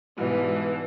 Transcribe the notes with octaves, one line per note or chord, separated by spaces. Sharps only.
G#2 B2 E3 G3